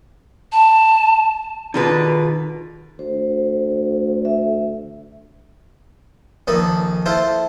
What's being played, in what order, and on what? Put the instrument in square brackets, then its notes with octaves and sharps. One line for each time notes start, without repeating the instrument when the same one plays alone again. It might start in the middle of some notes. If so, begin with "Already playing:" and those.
[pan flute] A5
[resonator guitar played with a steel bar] B2 D3 B4 [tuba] D#3 [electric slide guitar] D#4 F4 G#4
[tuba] D2 [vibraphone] C5
[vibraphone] E5
[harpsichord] A#1 D#3 A4 B5
E4 F4 A4 C5